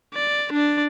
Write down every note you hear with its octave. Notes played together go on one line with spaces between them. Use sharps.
D5
D4 D5